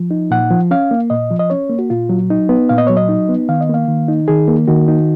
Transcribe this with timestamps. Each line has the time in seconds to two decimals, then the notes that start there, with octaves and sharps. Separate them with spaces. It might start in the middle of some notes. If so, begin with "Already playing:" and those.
Already playing: F3
0.11 D#4
0.31 A#2 F#5
0.50 F3
0.71 C#4 F5
0.91 A#3
1.10 A#2 D#5
1.31 F3
1.39 D#5
1.50 C#4 C#5
1.70 A#3
1.79 F#4
1.90 A#2 F4
2.09 F#3
2.30 D#4
2.49 B3
2.69 A#2 F5
2.78 D#5
2.87 F#3 C#5
2.97 D#5
3.09 D#4
3.29 B3
3.49 D#3 F5
3.61 D#5
3.69 A#3 F5
3.88 D#3
4.08 D#4
4.28 D#3 G#4
4.48 A#3
4.68 D#3 F#4
4.88 D#4